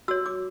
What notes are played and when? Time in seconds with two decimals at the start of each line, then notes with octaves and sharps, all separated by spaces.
0.08 F#4 C#5 E6
0.26 D6